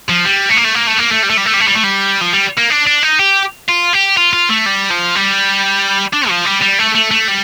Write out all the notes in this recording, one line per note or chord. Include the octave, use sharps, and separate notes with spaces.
F3
G3
A3
A#3
A3
A#3
A3
A#3
A3
G3
A3
G3
A3
G3
A3
G3
A3
G3
F3
G3
A#3
D4
D4
D#4
G4
F4
G4
F4
F4
A3
G3
F3
G3
D4
F3
G3
G3
A3
A3
A3
G3